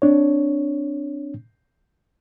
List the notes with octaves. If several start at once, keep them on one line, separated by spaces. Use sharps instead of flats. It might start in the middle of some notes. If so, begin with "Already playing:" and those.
C4 D4 C#5